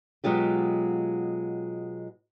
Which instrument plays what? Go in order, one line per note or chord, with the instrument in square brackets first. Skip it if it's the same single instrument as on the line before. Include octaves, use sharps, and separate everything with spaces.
[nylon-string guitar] B2 F#3 G#3 F4 G4